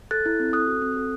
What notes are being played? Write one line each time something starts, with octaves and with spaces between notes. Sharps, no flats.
A4 F#6 A6
E4
C4
A4 D#6 F#6
F#4
C4
A4